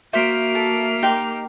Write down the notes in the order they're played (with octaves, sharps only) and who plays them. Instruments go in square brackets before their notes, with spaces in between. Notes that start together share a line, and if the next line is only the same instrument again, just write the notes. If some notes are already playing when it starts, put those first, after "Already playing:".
[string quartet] A#3 F6 [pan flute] F#4 [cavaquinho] C5 [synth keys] E5 B6 D7
[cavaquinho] A4
D#4 G4 C6